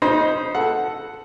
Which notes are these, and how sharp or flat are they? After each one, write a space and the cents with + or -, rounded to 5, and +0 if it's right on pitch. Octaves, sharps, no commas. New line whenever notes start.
D#4 +0 C5 +0 B5 -40
A4 +0 F#5 +0